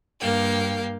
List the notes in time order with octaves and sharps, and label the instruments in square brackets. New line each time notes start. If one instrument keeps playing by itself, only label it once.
[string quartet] G2 A#3 F5 G5